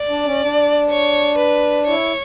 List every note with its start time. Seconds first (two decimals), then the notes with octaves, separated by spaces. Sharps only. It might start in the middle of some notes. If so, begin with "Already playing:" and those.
Already playing: D5
0.09 D4
0.25 C#4
0.42 D4
0.90 C#5
1.38 B4
1.86 E4 C#5